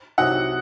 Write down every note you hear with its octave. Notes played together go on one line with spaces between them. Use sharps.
C2 C3 F#3 C4 D#4 F#5